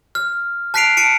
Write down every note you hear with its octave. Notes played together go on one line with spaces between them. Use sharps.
F6
A5 F#6 B6 C7 D7 F7
A5 C#7 D7